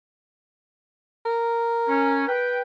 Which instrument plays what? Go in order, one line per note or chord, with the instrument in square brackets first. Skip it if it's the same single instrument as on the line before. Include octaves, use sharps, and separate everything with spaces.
[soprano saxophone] A#4
[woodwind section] C#4
B4 G5